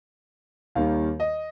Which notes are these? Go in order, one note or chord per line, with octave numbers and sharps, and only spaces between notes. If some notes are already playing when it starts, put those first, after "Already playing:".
D#2 D#3 G3 A#3 F5
D#5